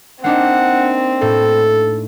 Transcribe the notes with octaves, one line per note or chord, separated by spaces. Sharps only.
A#3 C4 D4 D#4 F#5
A2 A4